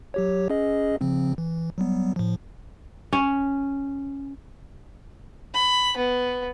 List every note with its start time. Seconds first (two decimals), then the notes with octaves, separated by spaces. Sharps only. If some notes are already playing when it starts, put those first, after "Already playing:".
0.14 F#3 G4 C#5
0.50 C#4 G#4 D#5
1.01 C#3 F3 C4
1.38 E3
1.78 F#3 G3 B3
2.16 A2 F3
3.13 C#4
5.54 B5
5.97 B3